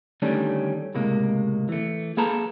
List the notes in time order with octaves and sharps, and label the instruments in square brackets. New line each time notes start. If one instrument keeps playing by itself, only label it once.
[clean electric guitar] D3 D#3 G3 A3 C#4 D4
C#2 A2 C3 G#3 A#3
E3 A3
A#3 G#4 A4 B4 A5 A#5